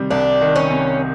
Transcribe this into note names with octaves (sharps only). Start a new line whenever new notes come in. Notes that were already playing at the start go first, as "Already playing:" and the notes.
Already playing: C3 D#3 G3
C2 D4
D#3
C#4
C3